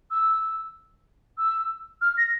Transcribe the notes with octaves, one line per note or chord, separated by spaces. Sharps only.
E6
E6
F6
A#6